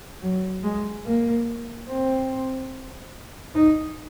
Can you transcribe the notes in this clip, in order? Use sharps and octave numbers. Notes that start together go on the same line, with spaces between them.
F#3
G#3
A#3
C4
D#4